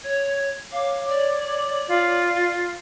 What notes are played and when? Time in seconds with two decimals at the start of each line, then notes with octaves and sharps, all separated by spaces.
0.04 C#5 G#6
0.72 C#5 F5 D6
1.08 D5
1.88 F4